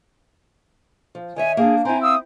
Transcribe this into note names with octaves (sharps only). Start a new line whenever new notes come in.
F3
D#3 C#5 E5 G#5
A#3 D4 G#4
C4 E4 C5 G#5 A#5
F5 D#6 E6